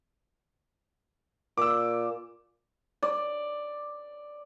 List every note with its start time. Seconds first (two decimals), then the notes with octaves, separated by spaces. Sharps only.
1.58 A#2 D6 E6
3.03 D5